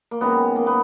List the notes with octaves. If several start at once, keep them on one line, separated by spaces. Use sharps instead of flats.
A#3
F#2 D#3 G#3 B3
A#3
B3